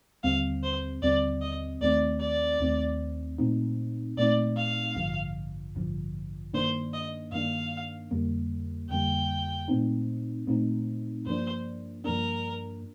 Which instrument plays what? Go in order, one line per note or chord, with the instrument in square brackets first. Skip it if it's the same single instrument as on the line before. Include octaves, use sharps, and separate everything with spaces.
[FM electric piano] D#2 D3 G3 C4 [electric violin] F5
[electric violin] C5
[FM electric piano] D#2 D3 G3 C4 [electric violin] D5
[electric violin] D#5
[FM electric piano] D#2 D#3 A3 C4 [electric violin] D5
[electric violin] D5
[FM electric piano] D#2 D#3 A3 C4
A#2 A3 C4 D#4
[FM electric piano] A#2 A3 C4 D#4 [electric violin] D5
[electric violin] F5
[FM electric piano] A1 G2 D3 F3
A1 G2 D3 F3
[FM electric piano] G2 D#3 A#3 D4 [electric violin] C5
[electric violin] D#5
[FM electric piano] G2 D#3 A#3 D4 [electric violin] F5
[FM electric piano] F2 D3 G3 A#3
[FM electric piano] F2 D3 G3 A#3 [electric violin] G5
[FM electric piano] A#2 A3 C4 D#4
A#2 A3 C4 D#4
[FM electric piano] G2 F3 A#3 D4 [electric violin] C5
[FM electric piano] G2 F3 A#3 D4 [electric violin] A#4